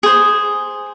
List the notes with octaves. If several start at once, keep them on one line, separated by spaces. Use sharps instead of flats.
G#4 C5